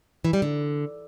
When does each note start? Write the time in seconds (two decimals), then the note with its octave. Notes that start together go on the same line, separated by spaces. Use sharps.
0.25 E3
0.33 G3
0.42 D3